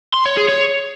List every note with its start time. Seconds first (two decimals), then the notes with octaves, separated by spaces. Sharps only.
0.14 C6
0.26 C#5
0.37 G#4
0.49 C#5